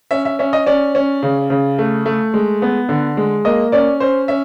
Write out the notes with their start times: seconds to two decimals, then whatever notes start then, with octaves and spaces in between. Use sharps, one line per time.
0.11 C#4 E5
0.25 E5
0.39 C#4 E5
0.53 D#5
0.66 C#4 D5
0.95 C#4
1.23 C#3
1.50 C#3
1.79 A3
2.06 A3
2.34 G#3
2.62 B3
2.89 D3
3.17 G#3
3.45 A#3 D#5
3.72 C#4 D5
4.00 C#4 C5
4.28 C#4 E5